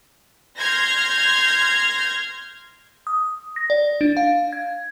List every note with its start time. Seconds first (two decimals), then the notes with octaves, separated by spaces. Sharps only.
0.58 C6 F6 G6 G#6 A#6
3.07 D#6
3.56 A#6
3.70 D5
4.01 D4
4.17 F5
4.53 G#6